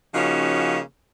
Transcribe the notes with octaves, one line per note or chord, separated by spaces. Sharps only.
C#3 F3 A#3 C#4 D#4 F#4